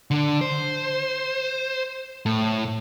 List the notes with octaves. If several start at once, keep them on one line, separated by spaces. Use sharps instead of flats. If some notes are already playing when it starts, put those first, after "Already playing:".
D3
C5
A2